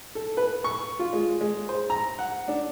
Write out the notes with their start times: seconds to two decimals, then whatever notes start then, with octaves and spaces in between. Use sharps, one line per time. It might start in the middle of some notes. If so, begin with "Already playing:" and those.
0.15 A4
0.37 B4
0.64 C#6
0.99 F4
1.13 G#3
1.41 G#3
1.69 C5
1.90 A#5
2.19 F#5
2.48 D4